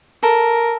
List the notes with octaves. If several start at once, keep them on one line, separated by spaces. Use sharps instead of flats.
A4 A#4